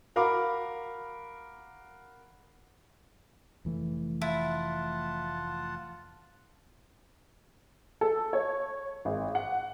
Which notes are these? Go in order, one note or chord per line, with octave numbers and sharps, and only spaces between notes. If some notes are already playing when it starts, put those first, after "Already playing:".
F#4 A#4 F5 B5 D6
F1 E3 A3
E4 F4 F#5 A5
A4
C#5
G#1
F#5